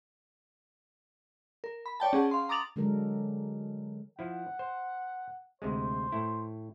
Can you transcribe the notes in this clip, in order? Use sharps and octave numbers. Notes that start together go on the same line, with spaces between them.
A#4
B5
C#5 D5 G5 A5
C#4 G#4 F#5 A5
F5 C6
A#5 D6 D#6 A6 F7 F#7
D3 F#3 G#3 D4 A4 A#4
F3 E4 F#5
C5
D2 C3 G#3 C5
A2 E4